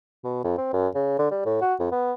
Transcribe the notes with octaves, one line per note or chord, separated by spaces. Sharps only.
B2
F2
C4
F#2
C#3
D3
G3
A2
F#4
F2
B3